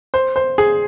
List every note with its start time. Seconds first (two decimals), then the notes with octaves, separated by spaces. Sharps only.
0.14 C5
0.36 C5
0.58 G#4